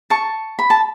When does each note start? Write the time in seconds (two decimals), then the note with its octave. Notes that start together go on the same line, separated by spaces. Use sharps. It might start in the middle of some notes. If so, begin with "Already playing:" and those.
0.10 A5 C#6
0.59 B5
0.70 A5